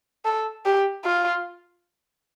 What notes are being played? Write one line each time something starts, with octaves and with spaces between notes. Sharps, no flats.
A4
G4
F4